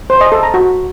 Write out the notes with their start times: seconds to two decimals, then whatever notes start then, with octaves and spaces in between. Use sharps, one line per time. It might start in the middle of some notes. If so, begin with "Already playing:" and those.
0.10 C5
0.21 D#5
0.32 A4
0.43 A#5
0.54 F#4